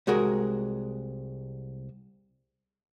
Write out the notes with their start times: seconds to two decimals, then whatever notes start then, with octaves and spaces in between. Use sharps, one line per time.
0.07 C2 G#3 F#4 G#4 A#4